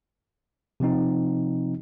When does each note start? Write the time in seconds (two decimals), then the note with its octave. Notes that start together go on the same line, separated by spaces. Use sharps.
0.80 C3 F3 C4 D#4